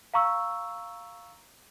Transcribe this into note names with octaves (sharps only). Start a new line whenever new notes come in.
F5 A#5 C#6 E6